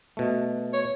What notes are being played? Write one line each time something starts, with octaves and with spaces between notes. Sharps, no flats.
B2 A3
C#5